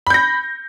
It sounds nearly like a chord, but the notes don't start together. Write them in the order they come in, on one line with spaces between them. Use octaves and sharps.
B5 G6 A#6